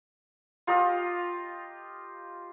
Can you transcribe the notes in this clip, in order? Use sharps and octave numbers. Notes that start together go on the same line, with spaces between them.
F4 G4 A#4 D#5